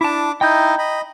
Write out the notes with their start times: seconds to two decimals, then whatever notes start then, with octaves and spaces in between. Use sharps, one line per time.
0.01 D4 E4 A5 D6
0.41 D#4 E4 D#5 G5 A#5 G6
0.78 D#5 B5